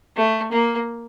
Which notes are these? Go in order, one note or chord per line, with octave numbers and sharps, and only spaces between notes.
A3
A#3